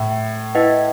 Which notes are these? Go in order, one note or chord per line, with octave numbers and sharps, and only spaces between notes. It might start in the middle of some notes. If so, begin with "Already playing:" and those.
Already playing: A2
E4 B4 D#5 F#5